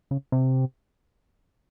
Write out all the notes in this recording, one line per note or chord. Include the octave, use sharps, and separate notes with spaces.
C#3
C3